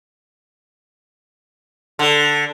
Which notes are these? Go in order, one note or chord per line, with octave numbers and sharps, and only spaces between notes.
D3